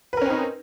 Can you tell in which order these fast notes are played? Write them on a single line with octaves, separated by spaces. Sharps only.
B4 A#4 C#4 C4 D#4